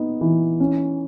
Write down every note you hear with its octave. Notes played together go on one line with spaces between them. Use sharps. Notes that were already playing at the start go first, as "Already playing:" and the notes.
Already playing: B3 D#4
E3
C#4